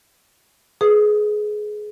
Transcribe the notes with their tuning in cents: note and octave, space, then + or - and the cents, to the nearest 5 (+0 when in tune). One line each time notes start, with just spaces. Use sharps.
G#4 +20 B4 +0 D#6 +0